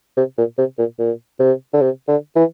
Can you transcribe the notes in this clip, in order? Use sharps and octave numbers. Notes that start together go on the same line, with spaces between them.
C3
A#2
C3
A#2
A#2
C3
D3
C3
D3
E3